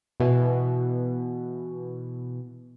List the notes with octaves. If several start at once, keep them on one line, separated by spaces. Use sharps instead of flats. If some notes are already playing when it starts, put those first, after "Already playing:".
B2 E3